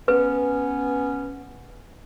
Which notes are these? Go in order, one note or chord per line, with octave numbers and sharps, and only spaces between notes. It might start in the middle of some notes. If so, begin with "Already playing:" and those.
B3 C#4 B4